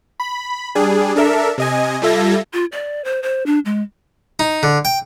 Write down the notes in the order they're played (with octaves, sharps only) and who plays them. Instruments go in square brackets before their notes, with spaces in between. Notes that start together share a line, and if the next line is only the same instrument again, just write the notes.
[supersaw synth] B5
G3 D4 G#4
D4 A4 A#4 E5
C3 D#5 G#5
G3 F4 A4 E5 G#6 A#6
[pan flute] F4
D5
C5
C5
D4
G#3
[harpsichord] D#4
D3
G5